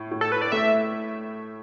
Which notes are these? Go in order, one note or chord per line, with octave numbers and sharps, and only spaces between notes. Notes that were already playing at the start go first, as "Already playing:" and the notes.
Already playing: A2
A2
A4
B4
D5
A3 E5